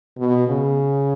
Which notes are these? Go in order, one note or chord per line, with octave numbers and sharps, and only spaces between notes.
B2
C#3